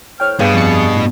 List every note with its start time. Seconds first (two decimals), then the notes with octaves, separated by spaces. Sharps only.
0.20 A2 C5 C#5 G5 F6
0.39 G2 B2 G#4
0.55 F2 A6 C#7
0.95 A2